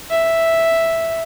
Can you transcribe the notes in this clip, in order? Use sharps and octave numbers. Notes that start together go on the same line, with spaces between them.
E5